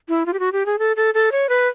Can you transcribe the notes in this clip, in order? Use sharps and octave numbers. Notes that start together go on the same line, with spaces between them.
E4
F4
G4
F#4
G4
G#4
A4
A4
A4
C#5
B4